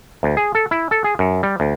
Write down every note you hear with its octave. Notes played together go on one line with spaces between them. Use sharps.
D2
G#4
A4
E4
A4
G#4
F#2
G3
D2